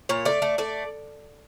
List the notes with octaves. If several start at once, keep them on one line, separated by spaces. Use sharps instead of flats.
A#2 C#5
A3 D5
A3
A3 D5